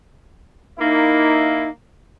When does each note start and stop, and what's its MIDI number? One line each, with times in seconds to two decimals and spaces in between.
0.79 1.67 58
0.79 1.70 63
0.79 1.67 64